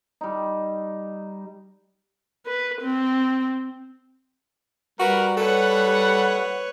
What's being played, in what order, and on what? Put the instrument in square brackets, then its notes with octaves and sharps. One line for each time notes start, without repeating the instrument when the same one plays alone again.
[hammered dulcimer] G3 D#4
[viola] B4
C4
[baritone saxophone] G3 [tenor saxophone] F#4 [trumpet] A#4 [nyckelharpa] B4
[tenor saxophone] A4 [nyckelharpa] B4 C#5 [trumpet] F#5